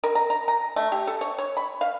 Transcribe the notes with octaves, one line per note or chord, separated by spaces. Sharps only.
A#4
A#5
A#5
A#5
A3
G4
A4
C#5
C#5
B5
F5